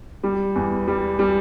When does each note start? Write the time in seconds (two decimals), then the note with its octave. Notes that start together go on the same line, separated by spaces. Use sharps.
0.23 G3
0.55 E2
0.87 G3
1.19 G3